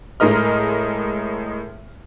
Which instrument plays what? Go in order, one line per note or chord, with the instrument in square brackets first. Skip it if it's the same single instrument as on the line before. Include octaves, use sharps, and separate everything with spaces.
[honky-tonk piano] A2 G#3 A#4 D#5 F6